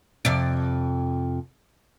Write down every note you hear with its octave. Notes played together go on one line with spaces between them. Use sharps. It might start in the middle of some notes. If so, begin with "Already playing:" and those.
F2 C3 D5